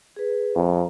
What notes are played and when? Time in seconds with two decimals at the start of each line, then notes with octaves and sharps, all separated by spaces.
0.16 G#4 B4
0.55 F2 A#5